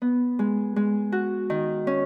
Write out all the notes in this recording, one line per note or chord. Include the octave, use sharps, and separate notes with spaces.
B3
G#3
G#3
F#4
D#3
C#4